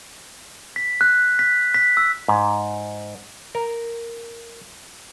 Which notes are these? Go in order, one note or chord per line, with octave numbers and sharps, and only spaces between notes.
B6
F#6
B6
B6
E6
G#2
A#4